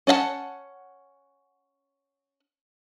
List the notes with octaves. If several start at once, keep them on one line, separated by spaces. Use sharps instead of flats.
C#4 D5 F5 F#5 A5